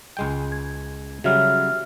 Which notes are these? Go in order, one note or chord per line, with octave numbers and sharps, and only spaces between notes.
C#2 G#3 G5
G#6
C#3 F#3 G3 F#4 E5 F6